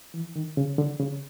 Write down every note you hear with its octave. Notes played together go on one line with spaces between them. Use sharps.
E3
D#3
C#3
D3
C#3